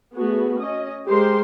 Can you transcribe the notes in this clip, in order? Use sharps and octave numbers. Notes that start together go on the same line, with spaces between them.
A3 B3 F#4 G#4
C#4 D#5
G#3 G4 A#4 C5 C6